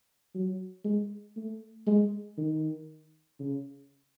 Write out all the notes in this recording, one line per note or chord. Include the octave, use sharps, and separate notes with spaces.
F#3
G#3
A3
G#3
D#3
C#3